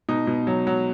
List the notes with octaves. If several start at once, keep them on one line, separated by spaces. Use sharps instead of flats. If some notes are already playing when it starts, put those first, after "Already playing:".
B2 D#4
B2
F#3
F#3